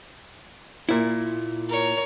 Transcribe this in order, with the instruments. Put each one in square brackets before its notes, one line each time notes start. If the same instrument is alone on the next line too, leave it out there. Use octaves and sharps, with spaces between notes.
[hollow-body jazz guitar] A#2 E4
[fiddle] A#4 C#5